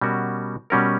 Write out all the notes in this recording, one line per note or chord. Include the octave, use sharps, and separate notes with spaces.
B2 G3 C#4 F#4 A#4
B2 G3 C#4 F#4 A#4